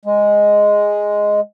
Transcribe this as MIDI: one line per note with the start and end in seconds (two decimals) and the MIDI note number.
0.05 1.40 56